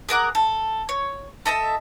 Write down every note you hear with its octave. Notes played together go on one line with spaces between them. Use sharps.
G#4 A#4 F#5 D6
A4
C#5
A4 D#5 E5 A5